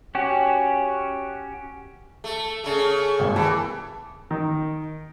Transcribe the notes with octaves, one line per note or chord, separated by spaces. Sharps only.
C#4 F#4 G4
A3
C#3 A3
G#1 D#2
E3 G#4 B4 A5
D#3